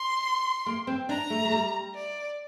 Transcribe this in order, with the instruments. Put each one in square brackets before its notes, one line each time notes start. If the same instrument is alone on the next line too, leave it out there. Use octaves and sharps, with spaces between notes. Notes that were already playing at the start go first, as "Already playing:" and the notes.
Already playing: [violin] C6
[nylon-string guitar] A#3
C4
[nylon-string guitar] D4 [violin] A#5
[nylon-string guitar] A3
A3
G3
[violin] D5